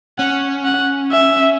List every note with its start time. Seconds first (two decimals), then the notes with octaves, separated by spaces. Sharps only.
0.18 C#4 F#5
0.65 F#5
1.12 E5